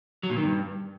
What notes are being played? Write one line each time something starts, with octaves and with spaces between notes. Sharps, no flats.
F#3
A#2
D#3
G2